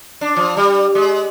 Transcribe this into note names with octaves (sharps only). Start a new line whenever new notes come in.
D4
F3
G3
G#3